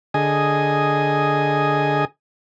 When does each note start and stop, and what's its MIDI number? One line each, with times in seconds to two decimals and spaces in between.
0.14 2.05 50
0.14 2.05 68
0.14 2.05 75
0.14 2.05 80